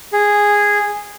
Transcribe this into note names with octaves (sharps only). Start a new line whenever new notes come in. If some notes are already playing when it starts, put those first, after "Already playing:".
G#4